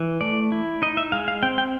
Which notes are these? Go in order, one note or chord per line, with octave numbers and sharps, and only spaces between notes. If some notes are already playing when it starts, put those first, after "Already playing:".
Already playing: E3
A3 D5
E4
D#4 D#5
E5
G#3 F5
F5
C4 G5
G5